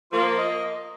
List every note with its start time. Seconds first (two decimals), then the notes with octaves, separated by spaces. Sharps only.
0.12 F3 A#3 F4
0.38 D#5